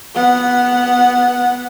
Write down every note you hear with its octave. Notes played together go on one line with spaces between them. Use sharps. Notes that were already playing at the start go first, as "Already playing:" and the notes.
B3 F#5